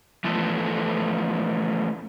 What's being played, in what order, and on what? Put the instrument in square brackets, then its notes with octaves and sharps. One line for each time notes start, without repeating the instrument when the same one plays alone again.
[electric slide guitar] E3 F3 A3 B3 A4